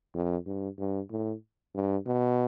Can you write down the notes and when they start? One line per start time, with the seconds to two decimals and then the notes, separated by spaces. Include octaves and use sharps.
0.15 F2
0.47 G2
0.79 G2
1.11 A2
1.75 G2
2.06 B2